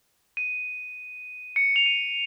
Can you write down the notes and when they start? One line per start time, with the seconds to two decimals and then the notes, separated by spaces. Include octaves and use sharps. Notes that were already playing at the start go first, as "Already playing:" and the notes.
0.37 D#7
1.56 C#7
1.76 F7
1.86 D#7